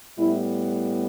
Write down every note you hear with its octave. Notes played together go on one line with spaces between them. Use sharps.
A2 G3 B3 E4